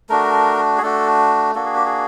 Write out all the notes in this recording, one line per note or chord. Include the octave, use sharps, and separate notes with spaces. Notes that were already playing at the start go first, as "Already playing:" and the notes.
A3 D4 F#4 A#4
G#4
A3 D4 F#4 A4
A#3 D4 F#4 A4
G#4
G4
G#4